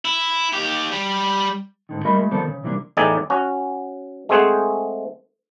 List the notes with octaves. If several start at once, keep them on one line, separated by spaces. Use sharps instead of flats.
E4
D#2 G4
G3
G#2 D3 D#3
G3 A3 F#4 A#4 D#5 B5
G#3 A3
D#3 F3 B3 A4 C5 D5
C#3
C3 E3 G3 A#3 D4
E2 A2 D#4 D5 G5 G#5
C#4 F#4
G#3 A3 C4 G#4 C5 F#5